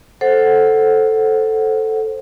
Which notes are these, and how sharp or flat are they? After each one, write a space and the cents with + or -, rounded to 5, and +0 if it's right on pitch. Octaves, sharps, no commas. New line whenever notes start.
A4 +0 C5 +10 F#5 +0